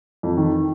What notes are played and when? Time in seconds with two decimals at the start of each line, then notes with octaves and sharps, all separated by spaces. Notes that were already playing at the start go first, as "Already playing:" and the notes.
0.23 F2
0.37 D#3